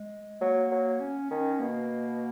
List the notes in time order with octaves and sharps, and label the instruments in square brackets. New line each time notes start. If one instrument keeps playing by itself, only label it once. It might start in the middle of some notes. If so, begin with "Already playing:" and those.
Already playing: [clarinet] G#3
[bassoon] F#3 [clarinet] A#3
[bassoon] F#3
[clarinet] C#4
[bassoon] D#3 [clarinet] C#4
[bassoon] B2 [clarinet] A#3